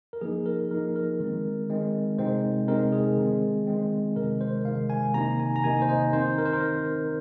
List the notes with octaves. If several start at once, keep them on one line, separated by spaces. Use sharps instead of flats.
A#4
F3 A#3 D#4 G#4
A#4
F3 A#3 D#4 A#4
A#4
D#3 G#3 C4
D#3 G#3 C4
C3 G#3 C4 D#4 C5
C3 G#3 C4 D#4 A#4
G#4
D#3 G#3 C4
D#3 G#3 C4
C3 D#3 G#3 A#4
C5
C3 D#3 G#3 F5
G#5
C3 D#3 A#3 D#4 A#5
G#5
A#5
C3 D#3 A#3 D#4 G#5
C5
D#5
D#3 C4 D#4 C5
A#4
C5
A#4